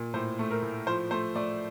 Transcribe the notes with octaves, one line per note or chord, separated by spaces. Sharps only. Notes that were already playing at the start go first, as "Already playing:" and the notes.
Already playing: A#2
A2 C5
A3
A#4
A2
F3 C5
A3 C5
A3 D5